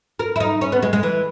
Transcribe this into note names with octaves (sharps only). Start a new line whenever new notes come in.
A#4
E4
D#4
C#4
B3
G#3
G#3
E3